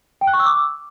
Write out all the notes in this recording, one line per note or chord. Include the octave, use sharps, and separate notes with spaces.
G5
F#6
C#6
E6
D6